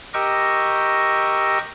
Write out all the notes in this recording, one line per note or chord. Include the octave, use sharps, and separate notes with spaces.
G4 A#4 D#5 G5 C#6 E6